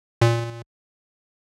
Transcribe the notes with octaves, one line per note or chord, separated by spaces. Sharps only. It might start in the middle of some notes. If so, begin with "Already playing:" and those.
A#2